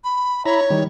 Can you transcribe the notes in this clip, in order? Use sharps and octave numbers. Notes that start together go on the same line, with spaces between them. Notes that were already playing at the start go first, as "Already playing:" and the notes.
B5
E4 C#5 A#5 B5
D#3 G3